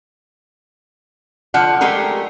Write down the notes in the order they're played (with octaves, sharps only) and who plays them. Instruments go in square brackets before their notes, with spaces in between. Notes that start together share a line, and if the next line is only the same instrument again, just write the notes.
[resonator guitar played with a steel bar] D3 F3 D5 F#5
G#3 A3 G4 G#4 A#4